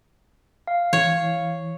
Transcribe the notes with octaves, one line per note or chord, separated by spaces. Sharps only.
F5
E3 C#5